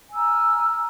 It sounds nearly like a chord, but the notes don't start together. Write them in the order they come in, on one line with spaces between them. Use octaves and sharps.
G#5 E6 A#5 F6